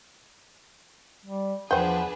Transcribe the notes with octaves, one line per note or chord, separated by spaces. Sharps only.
G3
E2 F3 D4 G#4 B4 C5 F#5 G5